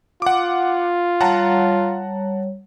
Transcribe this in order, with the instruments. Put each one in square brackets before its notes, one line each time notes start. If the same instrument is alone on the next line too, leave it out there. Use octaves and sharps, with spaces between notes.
[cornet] F4 [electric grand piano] F#5 D6
[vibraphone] G3 C#5 [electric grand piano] F#5 A5 A#5